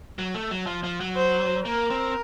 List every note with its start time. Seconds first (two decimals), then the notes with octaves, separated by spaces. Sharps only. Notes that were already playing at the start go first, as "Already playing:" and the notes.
0.19 F#3
0.34 A3
0.51 F#3
0.67 F3
0.84 F3
1.00 F#3
1.16 C5
1.65 A#3 A#4
1.90 C4